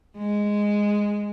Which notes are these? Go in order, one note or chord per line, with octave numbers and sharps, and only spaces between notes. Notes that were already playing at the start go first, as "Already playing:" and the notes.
G#3